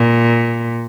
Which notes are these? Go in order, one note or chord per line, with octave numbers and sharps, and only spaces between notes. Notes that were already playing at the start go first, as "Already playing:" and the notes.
Already playing: A#2